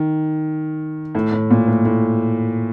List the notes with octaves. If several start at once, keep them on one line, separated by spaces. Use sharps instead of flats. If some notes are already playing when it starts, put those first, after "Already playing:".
Already playing: D#3
A2
A2
A#2
A2
A2